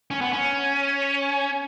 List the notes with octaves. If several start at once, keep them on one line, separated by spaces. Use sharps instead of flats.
C#4
B3
C#4